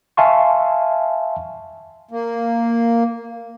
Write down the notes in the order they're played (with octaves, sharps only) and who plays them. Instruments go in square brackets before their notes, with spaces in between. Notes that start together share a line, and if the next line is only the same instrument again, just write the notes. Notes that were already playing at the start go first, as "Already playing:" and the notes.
[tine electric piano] E5 F5 G#5 A5 C6 C#6
[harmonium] A#3